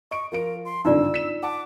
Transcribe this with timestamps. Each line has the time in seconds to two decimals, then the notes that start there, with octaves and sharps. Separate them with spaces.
0.11 D#5 C#6 D7
0.32 F3 F4 A#4 D7
0.65 C6
0.85 G#1 G2 D3 D#4 F4 D5 E6
1.14 B6 E7
1.43 F#5 A5 D6